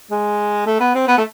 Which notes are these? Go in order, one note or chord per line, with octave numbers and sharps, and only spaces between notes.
G#3
A3
B3
C4
B3
A3